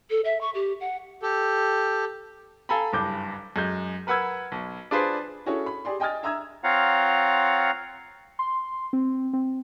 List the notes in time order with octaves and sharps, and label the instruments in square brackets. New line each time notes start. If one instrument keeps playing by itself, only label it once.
[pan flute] A4
E5
C#6
G4
F#5
[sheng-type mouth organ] G4 A4
[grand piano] A4 F5 G#5 A#5 B5
F#1 G2 D6 G6
F#2 G#3 G6
A#4 B4 F#5 B5 E6 G#6
B1
D4 F4 G#4 B4 C5 D5
[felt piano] C#4 E4 F#4 G#4 A4 C#5
B5
G4 G#4 D5 C6
D#5 G5 G#5 D#6 F6 A6
E5 A#5 D#6 E6 G#6
[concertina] C4 F4 C#5 F5 F#5 A#5
[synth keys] C6
C4
C4